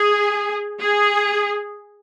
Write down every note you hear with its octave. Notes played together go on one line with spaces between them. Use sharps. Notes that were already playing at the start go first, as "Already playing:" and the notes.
Already playing: G#4
G#4